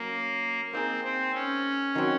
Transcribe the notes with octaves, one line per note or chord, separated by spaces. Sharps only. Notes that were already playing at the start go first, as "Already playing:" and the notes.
Already playing: F#3 A#3 C#4
A#3 C4 D#4 G#4
C4
C#4
D#3 F#3 C4 F#4